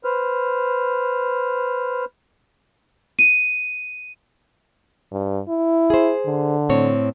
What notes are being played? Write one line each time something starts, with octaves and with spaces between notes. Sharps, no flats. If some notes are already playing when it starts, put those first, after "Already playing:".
B4 C5 F6
D#7
G2
E4
G#4 C5
D3
A2 C4 C#5